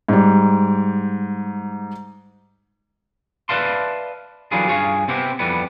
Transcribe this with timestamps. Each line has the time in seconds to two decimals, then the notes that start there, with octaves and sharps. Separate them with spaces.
0.09 G#2 G3
3.49 B4 D5 E5 F5 A5 C6
4.52 D3 E3 F#3 G3 F4 G#4
4.68 G2 F4 G#4 C#5
5.08 C3 B3 C4 E4 G4
5.39 F2 E3 G3 B3